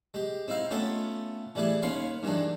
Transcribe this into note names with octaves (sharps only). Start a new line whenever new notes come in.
G#3 G4
C4 D#4 E4 F5
A3 B3 C#4 F4 A4
E3 G3 A3 E4 G#4
D#2 C#4 B4 F5 C6 C#6
G2 D#3 E3 G#3 D4